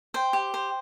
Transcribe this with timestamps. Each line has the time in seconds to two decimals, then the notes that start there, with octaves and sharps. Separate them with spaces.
0.14 C5 G5
0.33 G4
0.54 C5